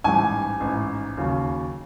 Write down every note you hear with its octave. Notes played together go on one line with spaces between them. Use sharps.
A1 G#2 E3 G3 G#5
A1 G#2 E3
D#2 C#3 F#3